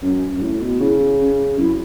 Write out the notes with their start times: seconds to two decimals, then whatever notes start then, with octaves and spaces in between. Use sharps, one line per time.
0.02 F#2 C#4
0.36 F#2
0.42 A2
0.61 B2
0.80 C#3 E4
1.20 C#4
1.58 F#2 E4